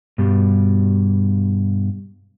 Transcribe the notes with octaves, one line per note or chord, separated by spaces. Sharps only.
G2 B2 G3